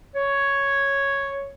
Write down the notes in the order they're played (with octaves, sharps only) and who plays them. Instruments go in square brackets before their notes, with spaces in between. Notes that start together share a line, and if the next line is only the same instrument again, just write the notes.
[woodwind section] C#5